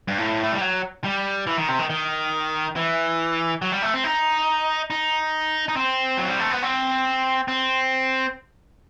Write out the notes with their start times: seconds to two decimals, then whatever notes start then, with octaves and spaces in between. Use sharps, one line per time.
0.08 G2
0.18 A2
0.43 A3
0.52 G3
0.61 F#3
1.04 G3
1.47 E3
1.57 D#3
1.68 C3
1.79 D#3
1.90 D#3
2.76 E3
3.62 F#3
3.72 G3
3.82 A3
3.94 C4
4.04 D#4
4.90 D#4
5.68 D#4
5.76 C4
6.17 F#3
6.28 G3
6.40 A3
6.51 B3
6.63 C4
7.48 C4